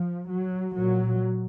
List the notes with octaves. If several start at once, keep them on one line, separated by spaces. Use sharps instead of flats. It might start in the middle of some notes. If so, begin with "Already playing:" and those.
Already playing: F3
F#3
A#2 F#3